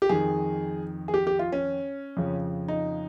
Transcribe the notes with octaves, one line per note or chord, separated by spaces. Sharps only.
G4
F2 D#3 G#4
G#4
G4
G4
F4
C#4
F2 C#3 F3
D#4